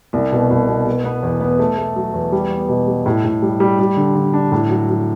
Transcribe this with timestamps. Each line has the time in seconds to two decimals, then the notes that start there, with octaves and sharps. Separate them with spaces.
0.13 C2
0.32 B2
0.50 C2
0.68 B2
0.86 B2
1.04 B3
1.23 E2
1.41 B3
1.59 A3
1.78 A3
1.96 F#3
2.14 E2
2.32 G3
2.51 B3
2.69 B2
2.87 G3
3.06 A2
3.24 A2
3.42 G3
3.60 G3
3.79 G3
3.97 D3
4.15 D3
4.33 D4
4.52 A2
4.70 F#3
4.89 F#3